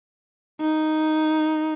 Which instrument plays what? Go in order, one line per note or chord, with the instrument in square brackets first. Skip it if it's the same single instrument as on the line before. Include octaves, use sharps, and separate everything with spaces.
[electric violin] D#4